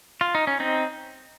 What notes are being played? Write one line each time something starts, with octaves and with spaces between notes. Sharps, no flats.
F4
D#4
C#4
C4 D#4